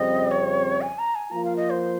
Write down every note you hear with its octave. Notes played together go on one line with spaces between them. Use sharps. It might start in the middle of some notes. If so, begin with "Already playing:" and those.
Already playing: F2 C#3 G3 C4 D#5
C#5
G#5
A#5
G#5
F3 A#3 F4 A#5
F5
D#5
C5